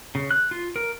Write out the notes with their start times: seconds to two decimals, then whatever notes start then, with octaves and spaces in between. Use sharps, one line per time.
0.15 C#3
0.31 F#6
0.51 F4
0.76 A#4